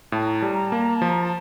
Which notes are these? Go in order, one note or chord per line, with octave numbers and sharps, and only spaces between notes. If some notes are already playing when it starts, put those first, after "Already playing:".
A2 A5
A#5
G3 A5
A#5
A#3 A5
A#5
A5
F3
A#5
A5